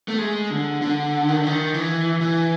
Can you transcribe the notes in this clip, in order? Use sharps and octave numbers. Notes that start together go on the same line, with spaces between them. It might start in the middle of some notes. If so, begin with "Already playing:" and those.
A3
G#3
D3
D3
D#3
D3
D#3
E3
E3